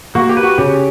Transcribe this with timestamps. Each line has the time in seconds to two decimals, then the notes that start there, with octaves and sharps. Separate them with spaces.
0.15 A#3 F#4
0.29 G4
0.37 B4
0.43 F#4
0.58 C#3 G4